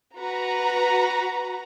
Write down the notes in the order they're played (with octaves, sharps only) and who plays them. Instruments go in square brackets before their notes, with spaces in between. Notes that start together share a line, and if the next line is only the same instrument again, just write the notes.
[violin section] F#4 B4 A#5